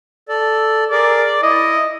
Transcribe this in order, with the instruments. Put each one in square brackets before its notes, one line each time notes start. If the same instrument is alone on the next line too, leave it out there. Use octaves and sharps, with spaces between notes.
[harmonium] A4 D5
[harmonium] G#4 A#4 [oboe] D5
[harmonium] E4 [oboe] D#5